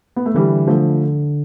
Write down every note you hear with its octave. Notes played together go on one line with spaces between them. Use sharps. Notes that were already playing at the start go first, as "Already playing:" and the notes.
B3
A3
D3 E3 G3
D3 F3 A3